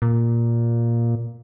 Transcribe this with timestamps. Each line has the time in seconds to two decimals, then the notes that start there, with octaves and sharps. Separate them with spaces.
0.02 A#2